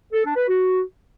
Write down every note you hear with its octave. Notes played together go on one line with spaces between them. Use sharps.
A4
D4
B4
F#4